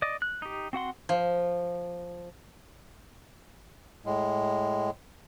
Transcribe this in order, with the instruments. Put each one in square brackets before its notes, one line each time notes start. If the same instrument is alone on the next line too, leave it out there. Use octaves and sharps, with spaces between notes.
[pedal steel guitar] D5 D#5
F#6
D#4 G4
C4 F#4 F#5 C6
[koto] F3
[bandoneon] A2 G#3